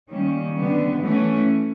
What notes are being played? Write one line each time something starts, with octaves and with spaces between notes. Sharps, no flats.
D#3 G3 A#3 C#4
D3 G3 B3
E3 A3 C#4